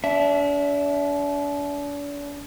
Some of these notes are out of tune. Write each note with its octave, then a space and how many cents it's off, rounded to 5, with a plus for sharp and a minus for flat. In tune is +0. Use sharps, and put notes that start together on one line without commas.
D4 -40 E5 +0